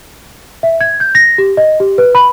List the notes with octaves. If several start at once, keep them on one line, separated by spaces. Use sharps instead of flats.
E5
G#6
G6
A#6
G4
D#5
G4
B4
B5